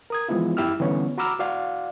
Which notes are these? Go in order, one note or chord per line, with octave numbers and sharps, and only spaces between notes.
A#4 D#6 G#6
E3 F3 G#3 B3 E4 F4
F#2 E4 G4 E6 F6
D3 E3 G3 B3 C#4 C#5
F#4 A#5 B5 D6 E6 F6
F#4 D5 F5 F#5